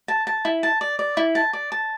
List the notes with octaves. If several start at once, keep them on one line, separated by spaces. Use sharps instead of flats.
A5
A5
E4
A5
D5
D5
E4
A5
D5
A5